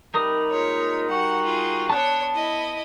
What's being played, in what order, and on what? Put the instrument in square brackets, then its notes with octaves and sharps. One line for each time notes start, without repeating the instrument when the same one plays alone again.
[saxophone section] C3 G3 [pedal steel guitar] D#4 A#4 D#6
[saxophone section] A#2 G3 G#3 [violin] C#5
[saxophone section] G3 F#4 [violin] F#5
[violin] F4 G#4
[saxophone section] B3 [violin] D4 C#5 [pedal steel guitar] A5 F#6
[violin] E4 D#5